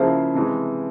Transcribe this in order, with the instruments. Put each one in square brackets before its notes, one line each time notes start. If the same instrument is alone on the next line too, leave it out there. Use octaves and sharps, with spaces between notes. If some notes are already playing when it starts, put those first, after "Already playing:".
Already playing: [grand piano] C#3 F3 A#3 E4 [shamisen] G#4 C5
[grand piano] C3 E3 G#3